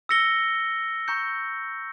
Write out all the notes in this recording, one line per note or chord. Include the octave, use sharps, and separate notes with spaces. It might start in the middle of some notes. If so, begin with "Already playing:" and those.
E6 A#6 C#7 G7
A#5 C#6 G6 C#7